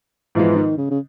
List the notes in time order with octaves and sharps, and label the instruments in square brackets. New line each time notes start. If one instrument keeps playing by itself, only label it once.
[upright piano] G#2 F3 G#3 B3 [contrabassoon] E3
[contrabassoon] D#3
C#3
C#3